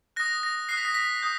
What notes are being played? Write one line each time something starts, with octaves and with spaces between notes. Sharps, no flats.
D#6 F#6 A#6
A#6
D#6 F#6 C7
B6
A#6
B6
D#6 G6